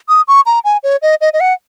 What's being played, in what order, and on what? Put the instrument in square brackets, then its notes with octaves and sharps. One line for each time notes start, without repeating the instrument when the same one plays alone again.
[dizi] D#6
C#6
A#5
G#5
C#5
D#5
D#5
D#5
F#5